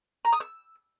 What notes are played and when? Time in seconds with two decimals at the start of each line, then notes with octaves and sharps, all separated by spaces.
0.25 A#5
0.33 D#6
0.40 E6